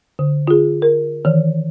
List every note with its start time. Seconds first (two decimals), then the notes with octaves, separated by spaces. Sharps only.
0.19 D3
0.47 F4 G#4
0.82 A#4
1.25 D#3 E3